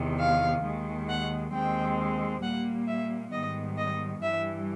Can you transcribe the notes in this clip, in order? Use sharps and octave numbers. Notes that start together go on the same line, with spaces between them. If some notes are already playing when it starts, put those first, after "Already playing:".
Already playing: E2 C3 D#3
F5
D#2 D#3 G#3
F#5
D#2 D#3 G#3 C4 G5
A#2 G3 A#3 F#5
E5
G#2 D#3 G3 B3 D#5
D#5
G2 E3 G3 E5